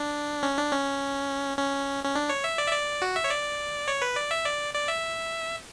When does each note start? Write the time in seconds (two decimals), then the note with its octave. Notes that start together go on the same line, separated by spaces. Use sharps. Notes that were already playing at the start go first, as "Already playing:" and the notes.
Already playing: D4
0.43 C#4
0.58 D4
0.72 C#4
1.58 C#4
2.04 C#4
2.15 D4
2.29 C#5
2.44 E5
2.58 D5
2.67 E5
2.72 D5
3.02 F#4
3.16 E5
3.24 C#5
3.30 D5
3.88 C#5
4.02 B4
4.16 D5
4.31 E5
4.45 D5
4.74 D5
4.88 E5